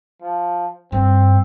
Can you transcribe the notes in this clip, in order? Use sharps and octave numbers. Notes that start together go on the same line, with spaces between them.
F3
G2 C4